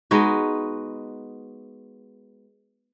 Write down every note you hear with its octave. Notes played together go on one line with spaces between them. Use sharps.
G#3 B3 D#4 F#4